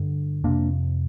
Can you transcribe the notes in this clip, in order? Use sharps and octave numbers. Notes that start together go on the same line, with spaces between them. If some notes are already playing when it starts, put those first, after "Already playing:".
Already playing: G2 D3
F2 C3 A#3 D4